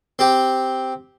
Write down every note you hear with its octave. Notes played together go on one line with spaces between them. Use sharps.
C4 G4